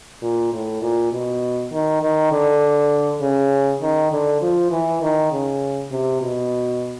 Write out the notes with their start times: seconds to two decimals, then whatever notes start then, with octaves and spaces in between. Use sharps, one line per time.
0.22 A#2
0.53 A2
0.82 A#2
1.12 B2
1.72 D#3
2.02 D#3
2.32 D3
3.21 C#3
3.82 D#3
4.12 D3
4.42 F3
4.71 E3
5.01 D#3
5.32 C#3
5.91 C3
6.22 B2